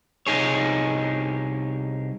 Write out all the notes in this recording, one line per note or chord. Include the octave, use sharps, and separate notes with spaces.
C2 G2 D#4 G#4 C#5